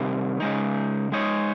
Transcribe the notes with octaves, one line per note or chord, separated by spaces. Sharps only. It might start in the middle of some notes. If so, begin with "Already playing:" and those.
Already playing: C3 D#3 G3
C#3 G#3 D#4
G#3 D#4 G#4 C#5